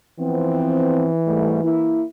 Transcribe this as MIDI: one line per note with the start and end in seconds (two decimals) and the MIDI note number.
0.19 2.05 52
0.19 1.09 53
0.19 1.09 59
0.19 1.09 60
1.26 1.62 44
1.26 1.62 55
1.26 1.62 57
1.63 2.03 58
1.63 2.03 64